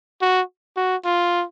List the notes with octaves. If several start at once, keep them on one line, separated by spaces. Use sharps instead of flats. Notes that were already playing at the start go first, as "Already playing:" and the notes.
F#4
F#4
F4